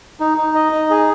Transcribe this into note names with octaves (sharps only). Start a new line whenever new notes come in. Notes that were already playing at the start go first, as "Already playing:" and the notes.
D#4
D#4
D#5
D#4
G#4